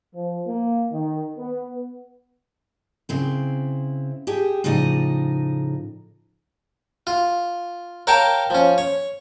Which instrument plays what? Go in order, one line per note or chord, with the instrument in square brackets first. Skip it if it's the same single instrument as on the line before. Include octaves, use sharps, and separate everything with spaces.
[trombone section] F3
A#3
D#3
B3
[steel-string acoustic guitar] C#3 C4 E4
G4 G#4 G5 A5
A2 C#3 F3 D#4 D5 D#5
[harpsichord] F4
A#4 C#5 F5 G5 A5
F3 C#4
C#5